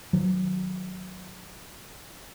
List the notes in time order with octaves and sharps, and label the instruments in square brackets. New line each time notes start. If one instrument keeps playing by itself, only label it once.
[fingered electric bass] D#3 F#3